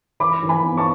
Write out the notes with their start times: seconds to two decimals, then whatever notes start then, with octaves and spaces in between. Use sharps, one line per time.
0.20 E3 B5 D6
0.43 E3
0.49 G#5 B5
0.63 B3
0.77 A5 C#6